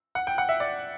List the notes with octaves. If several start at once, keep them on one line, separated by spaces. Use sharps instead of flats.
F#5
G5
F#5
E5
D5